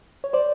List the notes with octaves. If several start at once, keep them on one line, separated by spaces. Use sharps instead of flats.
C#5
C5 D5